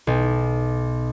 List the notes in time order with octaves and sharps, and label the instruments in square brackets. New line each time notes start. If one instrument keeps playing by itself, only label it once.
[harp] B1